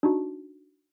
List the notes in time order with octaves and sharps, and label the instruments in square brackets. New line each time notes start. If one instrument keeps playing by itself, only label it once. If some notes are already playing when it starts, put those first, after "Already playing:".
[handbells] D4 D#4 F#4